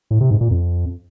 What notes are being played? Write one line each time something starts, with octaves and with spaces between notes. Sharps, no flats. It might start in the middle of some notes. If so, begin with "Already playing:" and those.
A2
C3
G#2
A#2
F2